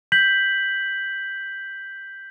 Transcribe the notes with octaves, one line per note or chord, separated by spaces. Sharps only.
G6 B6 F#7